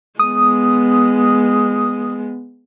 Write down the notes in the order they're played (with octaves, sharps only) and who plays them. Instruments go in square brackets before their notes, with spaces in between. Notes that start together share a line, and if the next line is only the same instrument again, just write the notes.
[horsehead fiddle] G#3 B3 [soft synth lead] D#6